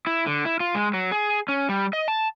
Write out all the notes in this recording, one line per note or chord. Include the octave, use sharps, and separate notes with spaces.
E4
D3
E4
F4
G#3
F#3
G#4
C#4
G3
D#5
A5